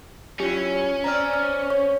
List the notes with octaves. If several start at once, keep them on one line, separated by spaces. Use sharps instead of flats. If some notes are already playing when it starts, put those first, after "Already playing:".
F#3 C#4 E4 F4 G4
C4 D5 A#5 F6
F6
C#5 C#6